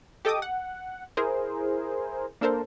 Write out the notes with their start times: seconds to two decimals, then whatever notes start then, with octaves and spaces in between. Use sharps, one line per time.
0.25 G4 A4 D#5 G5 D6 D#6
0.42 F#5
1.17 E4 G#4 A#4 C5
2.41 A#3 D4 A4 A#4 C5